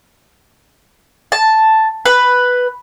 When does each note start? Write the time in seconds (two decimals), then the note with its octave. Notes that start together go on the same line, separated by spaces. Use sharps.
1.32 A5
2.06 B4